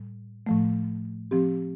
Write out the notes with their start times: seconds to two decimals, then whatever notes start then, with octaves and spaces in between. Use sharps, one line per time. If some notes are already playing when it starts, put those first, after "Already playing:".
Already playing: A2 G3
0.47 A2 F3 A3
1.31 F3 C4 G4